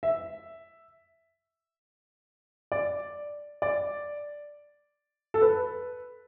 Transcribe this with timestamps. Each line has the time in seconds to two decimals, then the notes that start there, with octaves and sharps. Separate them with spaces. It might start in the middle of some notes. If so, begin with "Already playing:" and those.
0.03 E5
2.72 D5
3.62 D5
5.34 A4
5.42 B4